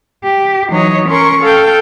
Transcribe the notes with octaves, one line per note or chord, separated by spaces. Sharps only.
G4
E3 F#3 D#4 C#5 D#5
C#4 A#4 C6 C#6
A4 F5 G5